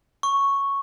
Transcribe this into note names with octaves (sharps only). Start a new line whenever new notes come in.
C#6